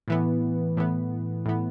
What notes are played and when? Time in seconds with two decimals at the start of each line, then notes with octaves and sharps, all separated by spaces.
0.08 A2 E3 B3
0.77 A2 E3 B3
1.46 A2 E3 B3